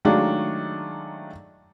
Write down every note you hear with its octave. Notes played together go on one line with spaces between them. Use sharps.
D#3 F#3 G#3 A3 D4 F4